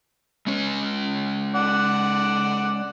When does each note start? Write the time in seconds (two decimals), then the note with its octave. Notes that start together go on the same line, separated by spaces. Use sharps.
0.47 G#3 C#4 C#5
1.55 D5 F#5